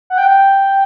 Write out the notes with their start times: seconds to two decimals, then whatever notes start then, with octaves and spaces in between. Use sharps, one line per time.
0.10 F#5
0.18 G5